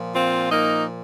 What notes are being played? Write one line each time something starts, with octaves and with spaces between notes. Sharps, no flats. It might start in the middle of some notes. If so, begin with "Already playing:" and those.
Already playing: A#2 F3
C4 F4
A#3 D#4